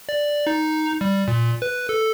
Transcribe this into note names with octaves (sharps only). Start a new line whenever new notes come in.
D5
D#4
G3
A#2
B4
A4